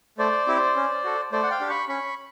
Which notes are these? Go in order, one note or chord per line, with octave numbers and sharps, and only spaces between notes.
A3 C5 D5
C4 E4 G4
C#4
F#4 A4
A3 C5 D5
F#5
F5 G5
D4 G4
B5 C#6
C#4 B5 C#6